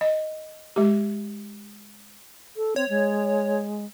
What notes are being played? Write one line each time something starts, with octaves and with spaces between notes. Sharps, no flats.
D#5
G#3 G4
A4
C4 C#5
G#3